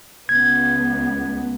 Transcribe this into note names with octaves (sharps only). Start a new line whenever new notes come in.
C#2 B3 G#6